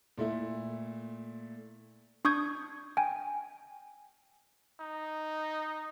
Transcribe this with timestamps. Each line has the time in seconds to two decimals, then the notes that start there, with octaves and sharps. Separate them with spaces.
0.18 A#2 A3 E4
2.25 D4 C#6 D#6 G6 G#6
2.97 G5 G#5
4.81 D#4